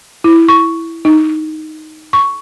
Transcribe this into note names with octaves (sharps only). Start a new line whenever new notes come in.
E4
C#6
D#4
C#6